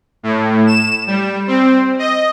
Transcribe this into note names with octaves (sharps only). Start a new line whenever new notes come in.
A2
E7
G3
C4
D#5